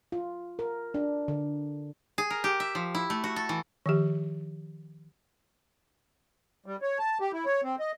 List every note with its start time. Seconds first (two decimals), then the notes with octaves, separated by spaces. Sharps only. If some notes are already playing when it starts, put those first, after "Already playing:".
0.12 F4
0.59 A#4
0.94 D4
1.28 D3
2.18 G#4
2.30 A#4
2.44 G4
2.60 E5
2.75 F3
2.95 E4
3.10 A3
3.24 F#4
3.36 A4
3.49 E3
3.86 D#3 F3 G4
6.66 G3
6.82 C#5
6.99 A5
7.21 G4
7.33 E4
7.45 C#5
7.63 C4
7.79 D#5